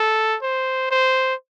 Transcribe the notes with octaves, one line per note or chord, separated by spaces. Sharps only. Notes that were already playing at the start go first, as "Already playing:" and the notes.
Already playing: A4
C5
C5